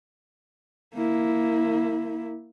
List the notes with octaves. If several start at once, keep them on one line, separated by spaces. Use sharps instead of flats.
A#3 E4